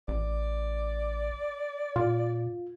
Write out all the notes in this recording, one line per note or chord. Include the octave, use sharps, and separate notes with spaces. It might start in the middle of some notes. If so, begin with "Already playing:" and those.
A1 D5
A#2 F4